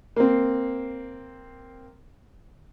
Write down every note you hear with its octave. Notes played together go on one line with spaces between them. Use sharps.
A#3 C4